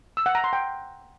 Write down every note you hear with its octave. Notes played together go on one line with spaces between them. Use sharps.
E6
F#5
A#5
C6
G5